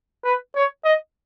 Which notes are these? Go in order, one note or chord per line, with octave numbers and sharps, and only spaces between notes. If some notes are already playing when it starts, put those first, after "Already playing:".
B4
C#5
D#5